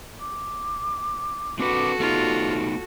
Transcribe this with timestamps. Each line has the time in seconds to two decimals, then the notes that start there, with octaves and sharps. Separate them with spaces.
0.20 D6
1.59 C4 D4 F#4 A4 B4 D6
2.00 A3 B3 D#4 F4 G4